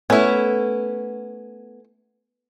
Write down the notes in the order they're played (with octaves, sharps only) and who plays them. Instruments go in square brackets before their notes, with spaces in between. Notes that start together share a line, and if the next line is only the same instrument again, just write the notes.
[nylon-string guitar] A3 B3 [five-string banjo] C#4 E4